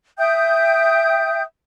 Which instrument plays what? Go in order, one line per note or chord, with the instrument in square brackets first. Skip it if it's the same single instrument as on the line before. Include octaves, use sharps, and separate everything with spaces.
[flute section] E5 G5 D#6 G6